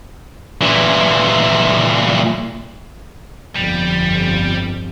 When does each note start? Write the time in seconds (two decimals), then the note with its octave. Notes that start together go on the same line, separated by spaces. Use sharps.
0.61 A#2 E3
3.56 G1 F2 G3